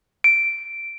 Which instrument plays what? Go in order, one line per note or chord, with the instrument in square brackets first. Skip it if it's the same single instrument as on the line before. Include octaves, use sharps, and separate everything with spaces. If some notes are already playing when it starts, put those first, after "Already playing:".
[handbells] D7